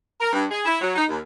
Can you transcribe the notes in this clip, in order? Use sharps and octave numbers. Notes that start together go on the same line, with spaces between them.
A#4
G2
G#4
E4
F#3
D#4
D#2